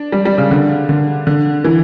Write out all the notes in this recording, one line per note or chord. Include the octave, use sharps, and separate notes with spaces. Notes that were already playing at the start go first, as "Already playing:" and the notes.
Already playing: D4
G3
G3
C#3
D3
D3
D3
E3